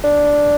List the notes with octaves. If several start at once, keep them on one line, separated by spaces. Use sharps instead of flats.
D4